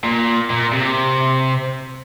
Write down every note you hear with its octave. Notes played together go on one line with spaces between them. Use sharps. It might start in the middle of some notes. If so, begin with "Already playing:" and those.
A#2
A#2
C3